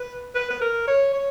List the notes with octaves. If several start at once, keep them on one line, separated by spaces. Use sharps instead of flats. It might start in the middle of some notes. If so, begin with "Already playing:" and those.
Already playing: B4
B4
B4
A#4
C#5
C#5